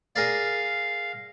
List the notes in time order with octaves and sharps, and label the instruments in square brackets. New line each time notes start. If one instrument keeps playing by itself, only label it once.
[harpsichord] G#4 A#4 D5 [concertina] F5